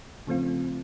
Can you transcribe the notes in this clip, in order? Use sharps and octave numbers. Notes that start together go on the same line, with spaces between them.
C#3 F3 A3 C4 F4